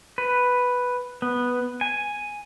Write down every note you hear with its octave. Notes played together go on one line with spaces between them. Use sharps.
B4
B3
G#5